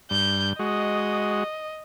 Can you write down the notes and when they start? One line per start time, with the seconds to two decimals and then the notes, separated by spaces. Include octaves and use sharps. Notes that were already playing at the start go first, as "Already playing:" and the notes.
0.11 G2 G6
0.59 G#3 F#4 D#5